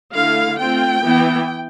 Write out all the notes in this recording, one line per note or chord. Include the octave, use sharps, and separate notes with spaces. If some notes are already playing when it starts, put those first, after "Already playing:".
D3 A3 E4 F5
A3 C4 F4 G5
E3 B3 E4